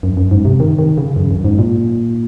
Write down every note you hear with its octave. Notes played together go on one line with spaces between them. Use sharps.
F#2
F#2
G#2
C3
D#3
D#3
C#3
F#2
F#2
G#2
A#2